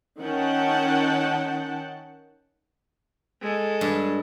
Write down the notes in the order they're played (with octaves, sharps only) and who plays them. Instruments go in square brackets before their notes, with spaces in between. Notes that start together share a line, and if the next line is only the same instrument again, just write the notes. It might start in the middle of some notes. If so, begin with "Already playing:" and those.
[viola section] D#3 C#4 F#5 G5 A5
[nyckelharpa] G#3 A4
[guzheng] G2